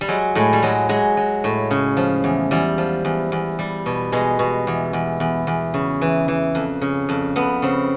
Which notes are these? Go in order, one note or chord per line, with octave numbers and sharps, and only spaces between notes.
G3
F#3 G#3
A2 G#3
G3
F#3 G#3
F#3 G#3
F#3
A2
C#3
F3
E2
E2 G3
F3
E2
E2
G3
B2
B2 G#3
B2
E2
E2
E2
E2
C#3
E3
E3
F2
C#3
F2
F2 B3
C#3 C4